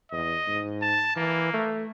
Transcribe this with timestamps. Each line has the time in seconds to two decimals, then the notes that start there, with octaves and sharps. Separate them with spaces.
0.12 E2 D#5
0.47 G#2
0.82 A5
1.16 E3 A#3
1.54 A3